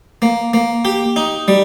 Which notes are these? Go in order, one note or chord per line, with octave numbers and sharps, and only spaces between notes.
A#3
A#3
G4
D#4
G3